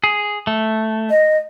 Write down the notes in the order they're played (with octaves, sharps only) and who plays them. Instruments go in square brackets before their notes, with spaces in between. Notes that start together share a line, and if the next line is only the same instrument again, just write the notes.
[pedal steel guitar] G#4
A3
[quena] D#5